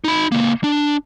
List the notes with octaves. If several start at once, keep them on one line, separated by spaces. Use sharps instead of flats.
D#4 B5
C#2 A#3
D4